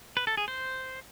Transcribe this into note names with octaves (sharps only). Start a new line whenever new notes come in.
B4
A4
G#4
C5